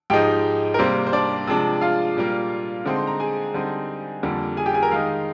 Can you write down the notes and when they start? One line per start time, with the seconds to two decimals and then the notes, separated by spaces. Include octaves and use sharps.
0.10 G#2 F3 G#3 D#4 G4 G5
0.74 A#4
0.79 C3 G3 A#3 C4 C5
1.07 C5
1.13 D4 D5
1.47 C3 F3 G#3 D4
1.81 F4 F5
2.17 A#2 G3 A#3
2.85 D3 G#3 C4 D#4
2.96 C6
3.07 A#5
3.20 G#4 G#5
3.54 D3 G3 C4 D#4
4.23 F2 D3 G3 A#3
4.57 G#4 G#5
4.66 G4 G5
4.74 G#4 G#5
4.82 A#4 A#5
4.91 D#3 G#3 D#4 F5 F6